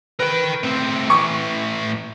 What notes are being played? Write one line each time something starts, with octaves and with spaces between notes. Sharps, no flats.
A#4 B4 G5
A2 C4
A2 E3 C#6